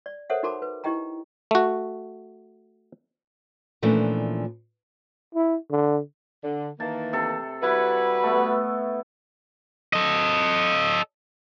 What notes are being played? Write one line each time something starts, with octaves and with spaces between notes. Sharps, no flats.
D5
A4 A#4 C5 C#5 E5 F#5
D#4 F#4 A#4 A5 B5 D6
B4
D#4 E4 G4 D#5 G5 A#5
A3 F#4
A#2 E3 F3 A3 C#4 D4
E4
D3
D3
D#3 E3 A#3 A5
C3 A4
G3 E4 F#4 B4
A3 B3
A4 D#5